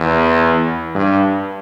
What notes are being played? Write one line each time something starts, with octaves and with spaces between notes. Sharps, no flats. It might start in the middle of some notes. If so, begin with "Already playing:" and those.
Already playing: E2
G2